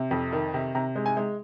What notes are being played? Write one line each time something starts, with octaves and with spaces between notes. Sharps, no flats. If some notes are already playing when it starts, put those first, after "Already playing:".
Already playing: C3
F2
D#3
C3
C3 A#5
G#3
G#5
G#3